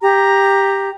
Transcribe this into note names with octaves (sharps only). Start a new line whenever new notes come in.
G4 A#5